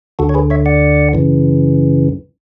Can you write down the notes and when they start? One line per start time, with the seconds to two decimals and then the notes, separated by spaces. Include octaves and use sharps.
0.19 D2 D3 F#4 A4
0.29 C#5
0.34 G#4 B4
0.50 C#5 E5
0.66 D5 F#5
1.13 F#2 C#3 E3